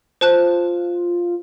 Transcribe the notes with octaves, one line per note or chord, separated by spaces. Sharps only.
F4 C5 A5 F#6